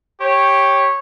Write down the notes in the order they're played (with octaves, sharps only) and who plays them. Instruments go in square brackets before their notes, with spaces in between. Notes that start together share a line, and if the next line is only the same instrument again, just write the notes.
[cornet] G4 [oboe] C#5